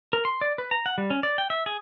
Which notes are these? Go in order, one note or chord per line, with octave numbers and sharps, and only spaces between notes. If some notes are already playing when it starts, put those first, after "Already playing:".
A#4
C6
D5
B4
A#5
F#5
G3
C#4
D5
G5
E5
G#4